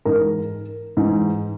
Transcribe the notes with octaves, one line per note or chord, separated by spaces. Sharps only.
G#2 E3 A#4
G#2 E3